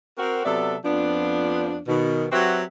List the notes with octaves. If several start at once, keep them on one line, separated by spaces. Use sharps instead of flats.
C4 F#4 A#4
C3 F#3 B3 A4 D5 E5
F2 F3 B3 D4
B2 D#3
F#3 C4 F#4 G4 B4 E5